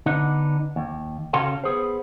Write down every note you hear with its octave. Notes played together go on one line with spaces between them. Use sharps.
D3 B3 D4 D#4
D#2
C#3 C#4 F#4 A4 F5 C6
B3 G#4 C5